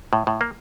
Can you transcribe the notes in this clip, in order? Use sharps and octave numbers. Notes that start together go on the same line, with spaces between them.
A2
A2
A#3